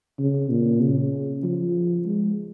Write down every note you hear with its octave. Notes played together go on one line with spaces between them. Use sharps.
C#3
A#2
C#3
F3
G#3